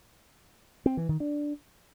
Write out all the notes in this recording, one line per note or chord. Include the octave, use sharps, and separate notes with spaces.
C4
E3
D#3
D4